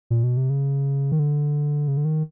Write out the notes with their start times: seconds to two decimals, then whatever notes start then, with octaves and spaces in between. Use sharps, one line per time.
0.10 A#2
0.23 B2
0.37 C3
0.50 C#3
1.12 D#3
1.19 D3
1.88 C#3
1.97 D3
2.05 D#3